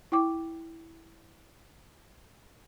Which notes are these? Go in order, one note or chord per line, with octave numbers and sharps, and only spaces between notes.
E4 G5 D6